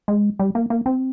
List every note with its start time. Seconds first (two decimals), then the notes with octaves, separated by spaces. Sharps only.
0.08 G#3
0.39 G3
0.55 A#3
0.70 A#3
0.86 C4